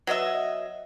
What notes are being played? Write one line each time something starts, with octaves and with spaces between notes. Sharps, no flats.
F#3 B3 D#5 E5